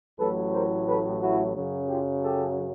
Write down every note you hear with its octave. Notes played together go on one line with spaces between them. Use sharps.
A1 A2 F#3 A4 B4
A#4 C5
A4 B4
E4 F#4
F#2 C#3 F#3
F4 G4
G4 A4